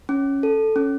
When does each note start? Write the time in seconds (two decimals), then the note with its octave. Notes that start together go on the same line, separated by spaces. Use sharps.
0.09 C#4
0.43 A4
0.76 C#4